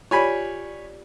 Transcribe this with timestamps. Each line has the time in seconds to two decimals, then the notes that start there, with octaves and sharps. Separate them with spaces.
0.11 F4 G4 C#5 D5 G#5 B5